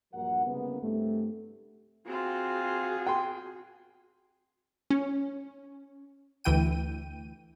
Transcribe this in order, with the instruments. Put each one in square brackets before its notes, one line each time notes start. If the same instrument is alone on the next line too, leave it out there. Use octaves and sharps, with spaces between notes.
[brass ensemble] A#1 G2 A#2 F#3 A#4 F#5
C2 C#3 G3 G#3 A#3 B3
C2 G2 C3 G3 A3
[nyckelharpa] C4 F4 [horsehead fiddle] F#4 G#4
[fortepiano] G5 C6
[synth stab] C#4
D2 E3 G5 D#7